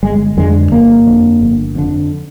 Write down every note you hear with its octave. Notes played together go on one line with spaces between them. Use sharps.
G1 G#3
F2 D3 G#3
G1 A#3
F2 D3
G1
F2 D3